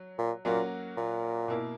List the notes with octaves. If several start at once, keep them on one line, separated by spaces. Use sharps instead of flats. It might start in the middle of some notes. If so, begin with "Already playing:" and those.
Already playing: F#3
A#2
A#2 F#3 A#3 C#4 F#4
A#2
B2 A#3 E4